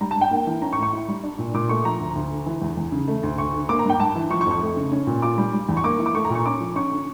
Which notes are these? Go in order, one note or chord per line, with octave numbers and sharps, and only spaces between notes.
G3 A#5
A5
G2
G5
A#3
E3
C#4 A#5
C#6
A2
C#6
E4
G3
D4
A#2
A#2 D6
A3 C#6
F3 A#5
D2
D2
D3
E3
E2
E2
C#3
A3
D2
D2 C#6
D3
A#3 D6
A#5
G2 G5
G2 A5
E3
F3 C#6
C#6
F2
C#6
A3
C#3
C#4
A#2
F4 D6
G3
G3
E2
C#6
A#3 D6
E3
D6
A3 C#6
A#5
A#2 C#6
C#4 D6
F3
C#4 C#6
D3